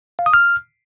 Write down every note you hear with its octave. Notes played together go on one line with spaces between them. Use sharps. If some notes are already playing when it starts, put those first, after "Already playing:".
F5
D#6
F6